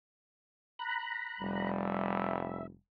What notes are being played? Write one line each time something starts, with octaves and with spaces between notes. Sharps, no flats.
A#5 B5 F#6
F1 G3
E5